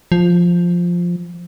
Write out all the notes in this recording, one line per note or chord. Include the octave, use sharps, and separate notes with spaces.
F3